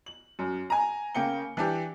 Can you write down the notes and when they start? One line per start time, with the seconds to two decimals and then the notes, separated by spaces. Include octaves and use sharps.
0.06 F#7
0.39 F#2
0.70 G#5 A#5
1.15 C#3 A#3 G5 C#7 G7
1.57 E3 D4 G4